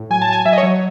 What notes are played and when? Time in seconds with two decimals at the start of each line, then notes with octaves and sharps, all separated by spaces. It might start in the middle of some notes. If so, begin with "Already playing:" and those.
Already playing: A2
0.10 F#3 G#5
0.22 A5
0.28 F#3 G#5
0.45 F#3 E5
0.53 D#5
0.58 C#5
0.63 F#3